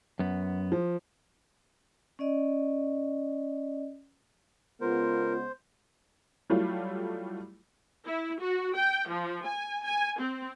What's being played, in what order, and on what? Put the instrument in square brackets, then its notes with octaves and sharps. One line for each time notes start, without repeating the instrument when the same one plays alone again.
[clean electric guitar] F#2 B3
[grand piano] F3
[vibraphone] C#4 D5 D#5
[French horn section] C#3 G#3 B3 [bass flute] F4 [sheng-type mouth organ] A#4 [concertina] C5
[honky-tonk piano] F#3 G3 A3 E4 F4
[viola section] E4
F#4
G5
F3
G#5
G#5
C4